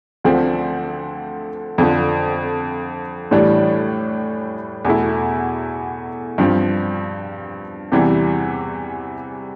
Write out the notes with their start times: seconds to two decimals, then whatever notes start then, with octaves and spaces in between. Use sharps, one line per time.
0.24 D2 D3 F3 A3 C4
1.78 F2 D3 F3
3.31 A2 E3 G3 D4
4.85 E2 B2 A3 E4
6.38 G2 F3 C4
7.92 E2 C3 E3 G3 C4